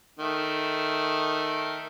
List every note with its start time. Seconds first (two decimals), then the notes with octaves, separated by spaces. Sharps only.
0.19 D#3 A3